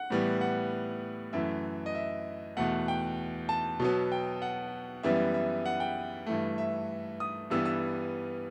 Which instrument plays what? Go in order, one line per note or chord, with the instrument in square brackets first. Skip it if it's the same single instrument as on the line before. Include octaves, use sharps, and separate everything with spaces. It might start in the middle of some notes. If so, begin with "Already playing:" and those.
Already playing: [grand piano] F#5
A2 E3 G3 B3
F#5
F#2 E3 A3 E5
D#5
E5
E2 B2 A3 F#5
G5
A5
B2 F#3 B3
G5
F#5
F#2 E3 G3 B3 E5
E5
F#5
G5
G2 E3 A3
E5
D#6
G2 E3 G3 B3 E6
E6